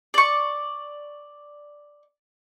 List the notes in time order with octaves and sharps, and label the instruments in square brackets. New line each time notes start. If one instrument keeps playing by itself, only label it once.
[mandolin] D5 C#6